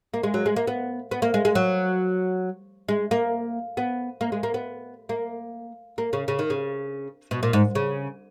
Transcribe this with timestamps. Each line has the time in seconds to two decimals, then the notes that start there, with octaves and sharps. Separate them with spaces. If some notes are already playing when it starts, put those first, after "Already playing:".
0.14 A#3
0.23 G#3
0.34 F#3
0.46 G#3
0.56 A#3
0.67 B3
1.11 B3
1.22 A#3
1.34 G#3
1.45 G#3
1.55 F#3
2.88 G#3
3.11 A#3
3.77 B3
4.21 A#3
4.32 G#3
4.43 A#3
4.54 B3
5.09 A#3
5.98 A#3
6.13 C#3
6.28 C#3
6.39 D#3
6.50 C#3
7.31 B2
7.43 A#2
7.53 G#2
7.75 C#3